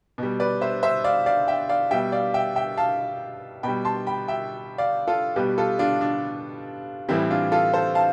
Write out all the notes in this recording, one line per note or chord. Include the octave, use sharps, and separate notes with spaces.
B2 G3
B4 D5
C5 E5
C5 E5
D5 F5
D5 F5
E5 G5
D5 F5
B2 G3 E5 G5
D5 F5
E5 G5
E5 G5
F5 A5
B2 G3 G5 B5
A5 C6
G5 B5
E5 G5
D5 F5
F4 A4
B2 G3 G4 B4
F4 A4
D4 F4
D4
A2 E3 G3 C4 E4
D4 F4
F4 A4
A4 C5
F5 A5